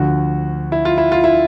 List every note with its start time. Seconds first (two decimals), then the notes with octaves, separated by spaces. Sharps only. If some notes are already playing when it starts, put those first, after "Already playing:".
Already playing: D2 D3 F3 F#4
0.72 E4
0.85 F4
0.98 E4
1.12 F4
1.24 E4